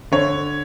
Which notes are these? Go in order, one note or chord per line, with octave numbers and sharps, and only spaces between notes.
D3 C#5